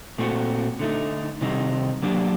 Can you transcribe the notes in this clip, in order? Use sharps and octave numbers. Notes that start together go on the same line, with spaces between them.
A#2 A3 C4 F#4
D3 A3 D#4
C3 D#3 G3 C4 D#4
F#3 A#3 D4 G4